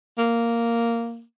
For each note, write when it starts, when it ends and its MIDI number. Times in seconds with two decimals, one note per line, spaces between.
0.18 1.23 58